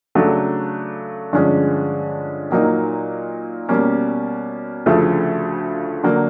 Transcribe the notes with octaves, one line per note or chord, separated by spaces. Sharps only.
C#3 F#3 A3 D4
G2 D3 F3 G#3 C#4
A#2 F#3 A#3 D#4
B2 G3 A#3 C#4
D2 C#3 F3 A3
D3 F#3 A#3